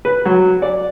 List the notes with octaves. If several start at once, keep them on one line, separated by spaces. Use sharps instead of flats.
B4
F#3
D5